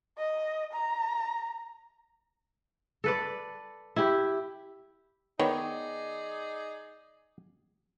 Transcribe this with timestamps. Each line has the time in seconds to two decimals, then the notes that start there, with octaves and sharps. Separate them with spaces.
0.18 D#5
0.73 A#5
3.04 A4 B4 D5
3.96 E4 G4
5.40 D#3 B3 D#4 G#4 C#5 D5